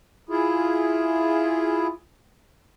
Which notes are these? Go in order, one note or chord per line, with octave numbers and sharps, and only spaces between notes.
E4 F4 G#4